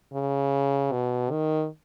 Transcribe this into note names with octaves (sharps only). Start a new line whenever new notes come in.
C#3
B2
D#3